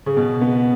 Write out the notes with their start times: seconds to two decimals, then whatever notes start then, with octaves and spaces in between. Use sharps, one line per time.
0.06 C#3
0.17 B2
0.41 B3